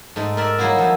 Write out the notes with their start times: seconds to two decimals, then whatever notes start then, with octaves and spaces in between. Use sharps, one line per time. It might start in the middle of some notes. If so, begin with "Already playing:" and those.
0.16 G#2 A3 D#4
0.37 A#4 D5 E5
0.58 F#3 G3 A#3 D#4 E4 F#4
0.78 F3 D#4 E4